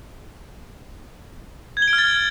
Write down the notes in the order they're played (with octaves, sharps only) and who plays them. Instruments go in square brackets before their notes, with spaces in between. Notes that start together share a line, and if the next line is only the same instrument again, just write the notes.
[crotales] G#6
G7
D7
F6
A6